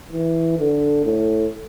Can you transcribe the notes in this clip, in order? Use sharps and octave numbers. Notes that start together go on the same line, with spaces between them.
E3
D3
A2